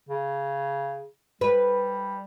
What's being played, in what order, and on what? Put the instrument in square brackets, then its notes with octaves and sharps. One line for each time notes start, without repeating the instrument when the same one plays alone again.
[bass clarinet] C#3
[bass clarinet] G3 [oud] B4